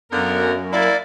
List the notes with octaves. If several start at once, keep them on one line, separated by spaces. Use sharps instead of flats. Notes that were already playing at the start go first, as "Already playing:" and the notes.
F#2 D3 A#3 B3 A#4
A#3 E4 D5